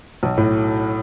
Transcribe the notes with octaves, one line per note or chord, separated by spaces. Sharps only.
B1
A2